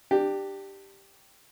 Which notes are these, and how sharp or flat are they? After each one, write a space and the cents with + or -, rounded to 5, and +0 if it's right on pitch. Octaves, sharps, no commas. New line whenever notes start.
D4 +25 G4 +0